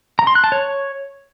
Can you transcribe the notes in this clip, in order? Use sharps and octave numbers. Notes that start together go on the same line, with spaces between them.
A#5
C6
F#6
A5
C#5